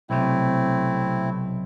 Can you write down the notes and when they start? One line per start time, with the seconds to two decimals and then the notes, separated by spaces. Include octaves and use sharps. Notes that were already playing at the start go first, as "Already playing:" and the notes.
0.10 B1 C3 A3 C4 E4